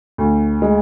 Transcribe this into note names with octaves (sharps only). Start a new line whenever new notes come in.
D2
G#3